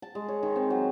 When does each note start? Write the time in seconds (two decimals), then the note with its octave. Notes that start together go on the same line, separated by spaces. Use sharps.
0.02 A5
0.15 G#3
0.28 C#5
0.43 D#3
0.56 C4
0.70 F#3